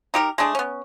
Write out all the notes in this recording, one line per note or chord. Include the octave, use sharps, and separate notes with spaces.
D#4 G4 A#4
G#3 A3 D4 G#4
B3 C#4